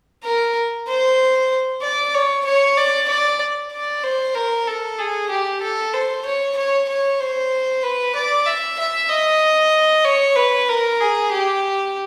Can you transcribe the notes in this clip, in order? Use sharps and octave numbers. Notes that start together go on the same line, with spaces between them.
A#4
C5
D5
C#5
C#5
D5
D5
D5
C5
A#4
A4
G#4
G4
A4
C5
C#5
C#5
C#5
C5
B4
D5
E5
E5
D#5
C#5
B4
A#4
G#4
G4